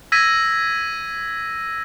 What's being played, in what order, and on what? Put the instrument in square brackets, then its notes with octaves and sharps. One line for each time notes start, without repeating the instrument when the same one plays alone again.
[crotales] E6 G#6 A#6 B6 D#7